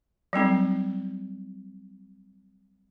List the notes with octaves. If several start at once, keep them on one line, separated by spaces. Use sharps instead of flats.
F#3 G3 C4 D#4